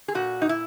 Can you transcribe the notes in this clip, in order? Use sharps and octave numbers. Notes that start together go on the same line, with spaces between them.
G#4
A#2 F#4
D#4
E4